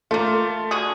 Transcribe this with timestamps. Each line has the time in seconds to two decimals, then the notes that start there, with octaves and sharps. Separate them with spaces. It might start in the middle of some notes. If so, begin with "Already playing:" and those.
0.11 A3 A#3 F4
0.71 D3 F#4 G#4